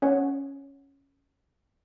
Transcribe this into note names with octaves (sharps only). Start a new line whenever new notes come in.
C#4 C#5 F#5